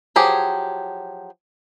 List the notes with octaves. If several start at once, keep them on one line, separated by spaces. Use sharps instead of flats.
F3 F#3 G4 G#4